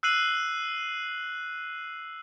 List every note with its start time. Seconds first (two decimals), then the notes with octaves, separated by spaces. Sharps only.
0.03 E6 F#6 C7 D#7 F#7